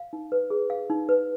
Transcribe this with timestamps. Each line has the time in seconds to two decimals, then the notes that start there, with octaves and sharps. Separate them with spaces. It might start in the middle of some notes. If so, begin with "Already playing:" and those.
Already playing: F5
0.13 D#4
0.32 B4
0.50 G#4
0.70 F5
0.90 D#4
1.09 B4